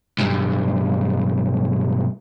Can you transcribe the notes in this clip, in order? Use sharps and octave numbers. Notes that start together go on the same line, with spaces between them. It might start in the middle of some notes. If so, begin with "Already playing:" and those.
B1 G2